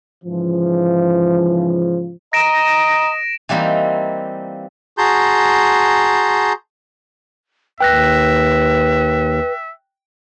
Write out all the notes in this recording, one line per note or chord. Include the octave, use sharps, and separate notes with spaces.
G#2 C#3 E3 F3
D#5 A#5 A#6 D7 E7
E3 G3 A#3 C4 D#4
F#4 G#4 A5 A#5 C6 G6
D#2 B4 E5 G5 F#6 A#6